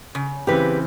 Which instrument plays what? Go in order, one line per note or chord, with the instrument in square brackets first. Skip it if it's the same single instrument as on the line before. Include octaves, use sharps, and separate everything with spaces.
[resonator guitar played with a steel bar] C#3
[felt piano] C#3 E3 C4 [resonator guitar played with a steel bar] G4 B4